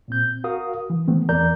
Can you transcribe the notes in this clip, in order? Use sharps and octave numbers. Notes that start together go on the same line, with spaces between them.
A#2 C4 G6
F#4 A#4 F5 D#6
E3
D#3 E3 A3 B3 C4
E2 E3 A#4 D5 A#5 G6